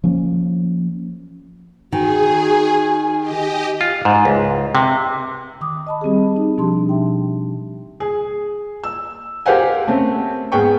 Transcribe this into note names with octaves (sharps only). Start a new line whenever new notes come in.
F3 A#3 C#4
D#3 F#4 G#4 G#5
G4 D#5 G#5
F4
G#2
C#2
C3
D#3 D6 D#6
D#5 A5 B5
G3 C4 G4 G#4
D#4
B2 F3 D4 G4 A5 C6
E5 G5
G#4
E6
G4 A#4 C5 F5 F#5 G#5
A3 C4 C#4
G#2 B3 G#4 B4 G5 C#6